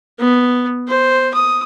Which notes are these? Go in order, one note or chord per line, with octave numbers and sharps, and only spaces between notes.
B3
C5
D#6